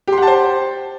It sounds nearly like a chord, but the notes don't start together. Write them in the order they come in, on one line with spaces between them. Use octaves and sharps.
G4 C6 F#5 A5 C5